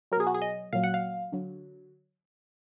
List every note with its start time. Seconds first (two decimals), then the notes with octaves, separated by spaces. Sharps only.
0.12 F#3 A#4
0.17 B2 G#4
0.27 F#4
0.34 G#4
0.42 D#5
0.73 A#2 F#3 F5
0.84 F#5
0.94 F5
1.32 D3 F#3